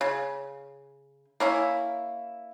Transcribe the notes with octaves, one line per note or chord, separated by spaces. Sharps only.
C#3
A#3 C#4 E4